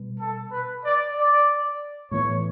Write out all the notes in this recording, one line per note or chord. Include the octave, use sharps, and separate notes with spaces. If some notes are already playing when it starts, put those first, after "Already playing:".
Already playing: B2 G3 B3
A4
B4
D5
D5
A2 E3 B3 C#5